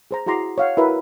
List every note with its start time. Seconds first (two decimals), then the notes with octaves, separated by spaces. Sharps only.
0.11 G#4 C5 A#5
0.26 E4 F#4 G#4 A#5 C6 D6
0.58 C#5 F5 F#5
0.77 E4 F#4 A#4 B4 E5